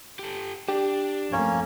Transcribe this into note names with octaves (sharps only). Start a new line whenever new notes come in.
G4 A4
D4 G4
F2 A3 A#3 C#4 C#5